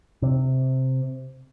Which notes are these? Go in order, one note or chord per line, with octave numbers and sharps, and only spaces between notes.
C3